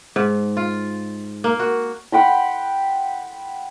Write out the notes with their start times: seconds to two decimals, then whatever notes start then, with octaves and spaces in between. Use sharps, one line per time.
0.16 G#2
0.57 F4
1.44 A#3
1.59 F#4
2.12 F#5 G5 B5 C6